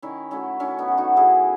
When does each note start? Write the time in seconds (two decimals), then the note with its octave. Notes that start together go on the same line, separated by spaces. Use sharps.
0.02 D#3 C#4 E4
0.31 F#3 A3 C#4 E4
0.60 D#3 C#4 E4
0.78 B3 D#4
0.88 F#3 A3
0.97 D#4 F#4
1.16 D#3 E4 G#4